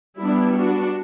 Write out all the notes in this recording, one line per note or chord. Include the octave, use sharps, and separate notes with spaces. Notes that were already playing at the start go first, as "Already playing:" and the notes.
G3 B3 D4 E4
D4 F#4